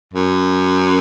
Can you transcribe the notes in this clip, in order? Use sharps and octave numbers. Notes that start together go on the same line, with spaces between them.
F#2